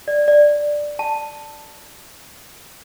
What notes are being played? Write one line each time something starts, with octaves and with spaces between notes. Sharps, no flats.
D5
D5
A5